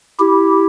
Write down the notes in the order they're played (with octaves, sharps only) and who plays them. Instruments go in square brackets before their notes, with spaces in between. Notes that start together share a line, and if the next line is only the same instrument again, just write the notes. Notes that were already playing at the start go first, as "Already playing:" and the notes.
[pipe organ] E4 G4